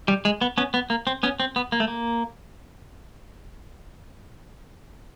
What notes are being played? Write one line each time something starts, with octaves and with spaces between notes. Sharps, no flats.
G3
G#3
B3
B3 C#4
B3
A#3
C4
B3 C#4
C4
B3
A#3
A3
A#3